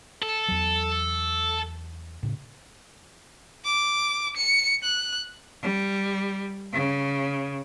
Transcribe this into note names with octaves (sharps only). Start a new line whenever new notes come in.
A4
E2 F#3
A2 C#3
D6
C#7
F#6
G3
C#3